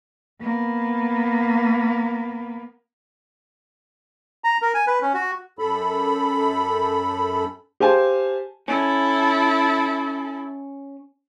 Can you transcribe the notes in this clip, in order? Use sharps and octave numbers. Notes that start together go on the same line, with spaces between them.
A#3 B3
A#5
A#4
G#5
B4
C#4
F#4
F#2 A4 B5
G4 C5 F5 G#5 A5
C#4 E4 A4